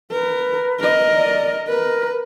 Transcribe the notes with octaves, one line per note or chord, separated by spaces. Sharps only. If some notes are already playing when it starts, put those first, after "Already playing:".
A#4 B4
A#4 D#5
D5
A#4 B4